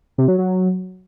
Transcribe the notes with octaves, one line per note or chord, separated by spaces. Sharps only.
C3
F#3
F#3